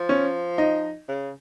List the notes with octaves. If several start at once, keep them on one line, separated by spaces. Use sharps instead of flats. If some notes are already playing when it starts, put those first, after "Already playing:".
Already playing: F3
C#4
D#4
C#3